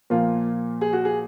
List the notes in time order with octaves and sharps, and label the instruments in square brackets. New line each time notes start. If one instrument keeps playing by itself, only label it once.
[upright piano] A#2 F3 A#3 F4
G#4
F#4
G#4